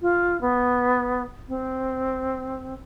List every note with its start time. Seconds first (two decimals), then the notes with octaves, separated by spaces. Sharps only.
0.01 F4
0.41 B3
1.48 C4